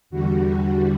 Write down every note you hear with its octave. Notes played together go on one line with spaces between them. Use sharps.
E2 D3 G3 F#4